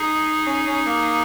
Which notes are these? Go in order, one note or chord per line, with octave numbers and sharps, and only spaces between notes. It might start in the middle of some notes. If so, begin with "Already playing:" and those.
Already playing: D#4 G#4
C#4
C#4
A#3